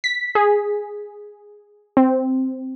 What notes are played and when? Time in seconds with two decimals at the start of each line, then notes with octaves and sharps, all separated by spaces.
0.04 B6
0.35 G#4
1.97 C4